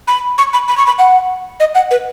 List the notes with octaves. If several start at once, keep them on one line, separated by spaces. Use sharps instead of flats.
B5
C#6
B5
B5
C#6
B5
F#5
D#5
F#5
B4